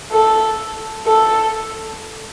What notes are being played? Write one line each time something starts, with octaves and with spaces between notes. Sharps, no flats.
A4
A4